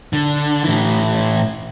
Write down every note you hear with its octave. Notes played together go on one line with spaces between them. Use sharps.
D3
A2 E3